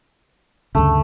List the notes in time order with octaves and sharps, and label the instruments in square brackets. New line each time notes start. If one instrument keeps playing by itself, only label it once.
[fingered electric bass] D2 G2 C#3 [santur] A3